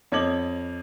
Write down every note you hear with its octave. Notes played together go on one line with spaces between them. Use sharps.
F2 C#5 D#5 D6 G#6 F#7